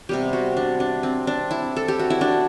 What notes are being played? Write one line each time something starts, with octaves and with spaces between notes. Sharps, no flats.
C3 G3 B3 G4
F#4
D4
D4
C4
D4
E4
A4
G4
F#4
E4
D4